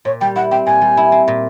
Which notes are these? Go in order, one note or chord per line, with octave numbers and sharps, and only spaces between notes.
A#2 C#5
G3 G5
E4 F#5
C4 G5
A#2 G#5
G3
E4
C4
A#2